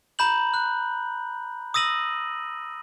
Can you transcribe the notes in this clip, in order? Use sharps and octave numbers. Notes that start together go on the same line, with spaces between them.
A#5 B5 G6 F#7
F#6
D#6 E6 A#6 D#7 F#7